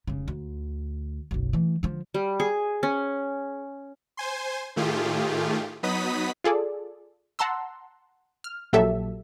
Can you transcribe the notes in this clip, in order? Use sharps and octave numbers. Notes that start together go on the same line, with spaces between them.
F1 C#3
D2
F#1 B1
E3 A3
D3 F3
G3
G#4
C#4
C5 G#5 C6
A2 D#3 A3 F4 G4 G#4
F#3 B3 D#4 B5 D#6 B6
F4 G#4 A4 D5
F#5 A5 A#5 C6 E6
F6
A#1 A#2 F#3 G4 A4 E5